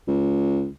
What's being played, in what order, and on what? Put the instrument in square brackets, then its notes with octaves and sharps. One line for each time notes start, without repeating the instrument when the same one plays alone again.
[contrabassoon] C#2